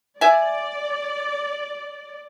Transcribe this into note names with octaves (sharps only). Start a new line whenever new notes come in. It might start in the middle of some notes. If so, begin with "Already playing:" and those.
D5 E5 G#5